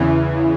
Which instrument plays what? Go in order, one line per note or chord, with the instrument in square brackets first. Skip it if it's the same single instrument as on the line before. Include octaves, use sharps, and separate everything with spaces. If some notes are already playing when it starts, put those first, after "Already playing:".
Already playing: [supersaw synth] E2 C#3 E3